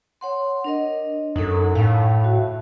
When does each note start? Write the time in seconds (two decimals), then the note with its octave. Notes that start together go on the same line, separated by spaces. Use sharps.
0.21 C#5 F#5 C6
0.64 D4 A#4 D#5
1.36 F#2 D#4 A4
1.75 A2 F5
2.24 F#4